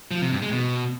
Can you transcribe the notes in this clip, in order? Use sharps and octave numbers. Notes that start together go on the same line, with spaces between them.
F3
C3
G2
G#3
B2